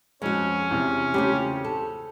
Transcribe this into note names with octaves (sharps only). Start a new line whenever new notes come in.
F2 G#3 C#4 F#4
E2 C3
C#3 A3 F4 G4 C5
A4